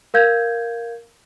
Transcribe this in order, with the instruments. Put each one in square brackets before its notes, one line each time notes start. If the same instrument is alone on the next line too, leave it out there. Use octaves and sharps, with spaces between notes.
[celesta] A#4 F5 G6 G#6